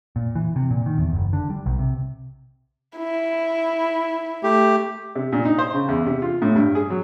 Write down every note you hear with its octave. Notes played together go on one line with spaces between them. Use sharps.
A#2
E3
C3
A#2
D#3
E2
F#1
D3
G3
B1
C3
E4
A3 G4
C3
A#2
D#4
C5
C#3
E2
C3
F4
A2
G2
G#4
F#3